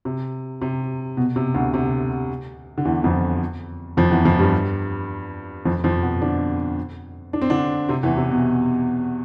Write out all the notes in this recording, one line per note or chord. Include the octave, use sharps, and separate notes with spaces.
C3
C3
B2
C3
D2 D3
C3
D3
E2 E3
F2 F3
F2 F3
E2 E3
F2 F3
G2 G3
F2 F3
F2 F3
B2 B3
D3 D4
D4
C4
D3 D4
C3 C4
E2 E3
C3
B2